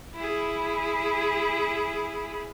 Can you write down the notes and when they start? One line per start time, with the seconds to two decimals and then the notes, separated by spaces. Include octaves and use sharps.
0.16 E4 G#4